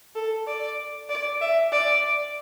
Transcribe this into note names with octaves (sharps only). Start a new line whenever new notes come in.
A4
D5
D5
E5
D5